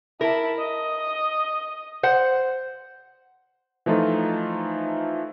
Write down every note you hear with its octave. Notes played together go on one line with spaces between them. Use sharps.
E4 A#4 A5
D#5
C5 F#5
E3 F3 A3 D#4 F4 A4